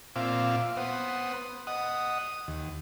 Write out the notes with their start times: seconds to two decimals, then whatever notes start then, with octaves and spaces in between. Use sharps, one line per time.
0.16 A#2 C4 F4 E5 F5 D6
0.77 B3 C5 F#5 D#6
1.67 D#5 F#5 D#6
2.48 D#2